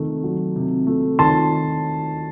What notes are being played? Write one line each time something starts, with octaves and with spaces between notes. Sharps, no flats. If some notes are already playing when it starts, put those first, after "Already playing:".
Already playing: C3 D#3 A3
F#3
C3
A3
D#3 A5 C6